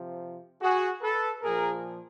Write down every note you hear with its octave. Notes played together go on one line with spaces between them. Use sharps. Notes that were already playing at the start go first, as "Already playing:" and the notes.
Already playing: C3 F3
F#4 G#4
A4 B4
A#2 F3 G#4 A#4